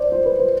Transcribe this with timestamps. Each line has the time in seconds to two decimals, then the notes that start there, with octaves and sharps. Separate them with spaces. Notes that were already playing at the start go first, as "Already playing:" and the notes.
Already playing: C5 D5
0.12 C5
0.26 B4
0.39 C5